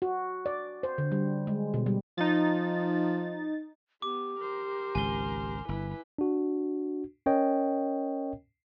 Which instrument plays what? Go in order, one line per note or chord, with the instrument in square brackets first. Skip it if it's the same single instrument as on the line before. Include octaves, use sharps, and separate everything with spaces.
[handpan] F#4
D5
C5
D3
G3
G#3
B2
G3
[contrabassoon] F3 [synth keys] D#4 A6
[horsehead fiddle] B3 [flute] G4 [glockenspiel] D6
[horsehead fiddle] A#4 C5
[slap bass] G#1 C#2 G#2 [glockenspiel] G#5 G7
[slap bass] G1 [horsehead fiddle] E4 B4
[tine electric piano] D4 F#4
C#4 A#4 C#5 D#5 G5